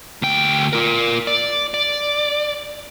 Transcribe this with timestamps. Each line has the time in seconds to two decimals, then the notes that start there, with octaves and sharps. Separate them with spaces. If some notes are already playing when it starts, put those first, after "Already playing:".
0.22 D2 G5
0.73 F4 A#4
1.27 D5
1.74 D5